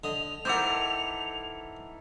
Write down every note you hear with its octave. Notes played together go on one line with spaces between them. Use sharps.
D3 D#5 F7
D#3 E3 C4 A4 A#4 F#5 D6 G6